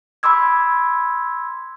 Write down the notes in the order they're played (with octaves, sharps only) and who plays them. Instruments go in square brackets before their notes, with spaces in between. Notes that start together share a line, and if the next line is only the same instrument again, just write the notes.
[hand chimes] B5 C6 D6 E6 G#6